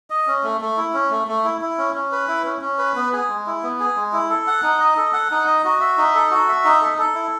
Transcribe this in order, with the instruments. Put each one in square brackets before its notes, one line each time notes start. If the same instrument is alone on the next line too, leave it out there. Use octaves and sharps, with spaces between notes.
[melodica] D#5
C#4
A3
A3
E4
C#4
A3
A3
E4
E4
C#4
C#4
B4
E4
C#4
C#4
B4
B3
G#4
G#3
E4
B3
G#4
G#3
E4
A4
F#5
D#4
D#5
A4
F#5
D#4
D#5
F#4
E5
D#4
A4
F#4
E5
D#4
A4
A4
E4